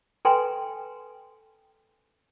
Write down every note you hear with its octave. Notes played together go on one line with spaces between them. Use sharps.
A4 B4 G5 G#5 A#5 C6